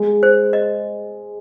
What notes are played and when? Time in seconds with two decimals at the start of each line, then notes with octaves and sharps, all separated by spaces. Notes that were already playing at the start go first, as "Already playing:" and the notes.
Already playing: G#3
0.23 C5
0.53 D#5